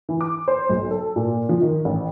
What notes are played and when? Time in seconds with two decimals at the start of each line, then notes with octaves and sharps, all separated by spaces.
0.09 E3
0.21 D6
0.48 C5
0.69 B1
0.91 A4
1.16 A#2
1.49 F3
1.61 D#3
1.85 A1